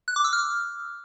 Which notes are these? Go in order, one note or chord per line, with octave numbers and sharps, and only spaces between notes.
F#6
D6
E6
F6